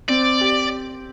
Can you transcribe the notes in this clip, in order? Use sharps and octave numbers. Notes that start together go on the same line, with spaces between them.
C4 D5
G4